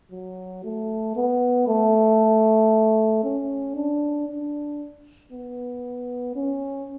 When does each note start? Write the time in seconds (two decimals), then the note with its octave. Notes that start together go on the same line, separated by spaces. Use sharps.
0.11 F#3
0.64 A3
1.16 B3
1.68 A3
3.24 C#4
3.75 D4
4.28 D4
5.32 B3
6.36 C#4